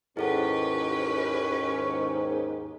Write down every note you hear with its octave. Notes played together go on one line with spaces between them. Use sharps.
D#2 G#2 C#4 E4 G4 A4 B4 F#5